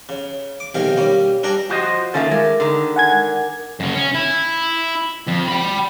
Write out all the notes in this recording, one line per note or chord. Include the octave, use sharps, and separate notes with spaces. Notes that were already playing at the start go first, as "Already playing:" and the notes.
C#3
D6
B1 C3 D#3 G#4 F5
G3 A#3 C#4
G2 D4 G#4 G5 A#5
F3 F#4 C5 D#5
D#3 A3 A#3 C#4 F4 A4
G#3 A3 A#4 D6
D3 D#3
F#5 G#5 G#6
F#2 C#3
C#4
E4
F2
G5 B5